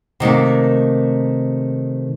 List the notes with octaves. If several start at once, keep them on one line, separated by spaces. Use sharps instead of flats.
C3 D#3 A3 A#3